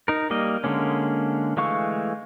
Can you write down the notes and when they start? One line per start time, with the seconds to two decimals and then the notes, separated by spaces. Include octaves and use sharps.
0.08 D#4 A#4
0.30 G3 A#3 D#5
0.64 D3 G#3 A#3 C#4
1.57 E3 G#3 A3 F5 C#6